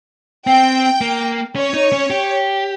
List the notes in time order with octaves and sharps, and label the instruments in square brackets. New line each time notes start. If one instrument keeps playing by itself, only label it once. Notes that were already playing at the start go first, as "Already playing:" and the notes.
[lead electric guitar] C4 [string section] G5
[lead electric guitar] A#3
[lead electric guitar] C#4 [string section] C#5
[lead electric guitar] D#4
C#4
G4